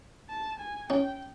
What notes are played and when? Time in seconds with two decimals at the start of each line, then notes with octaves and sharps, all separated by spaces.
0.30 A5
0.60 G#5
0.89 C#4 G5